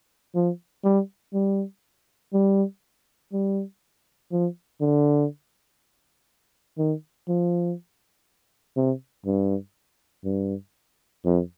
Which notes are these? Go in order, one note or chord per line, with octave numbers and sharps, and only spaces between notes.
F3
G3
G3
G3
G3
F3
D3
D#3
F3
C3
G2
G2
F2